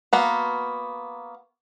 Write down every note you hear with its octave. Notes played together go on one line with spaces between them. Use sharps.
A#3 B3 F#4